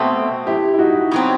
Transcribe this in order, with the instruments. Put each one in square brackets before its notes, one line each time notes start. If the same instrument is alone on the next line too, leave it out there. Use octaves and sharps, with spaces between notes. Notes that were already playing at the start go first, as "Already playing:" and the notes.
Already playing: [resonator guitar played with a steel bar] B2 A3 C4 [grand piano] F#4 A4
[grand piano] E4 G4
E4
D#4 F#4
[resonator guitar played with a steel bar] B2 F#3 C4